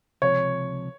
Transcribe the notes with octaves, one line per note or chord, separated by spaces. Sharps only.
C#2 C3 F3 C#5